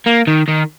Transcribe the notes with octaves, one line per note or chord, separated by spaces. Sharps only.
A#3
D#3
D#3